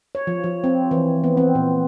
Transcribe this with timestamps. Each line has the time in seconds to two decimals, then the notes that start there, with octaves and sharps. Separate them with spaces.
0.15 C#5
0.27 F3
0.44 F3
0.64 C4
0.91 E3
1.24 B3
1.37 C4
1.55 A#2